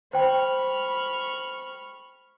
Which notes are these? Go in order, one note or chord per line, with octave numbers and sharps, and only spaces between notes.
C5 G5 B5 C#6 F6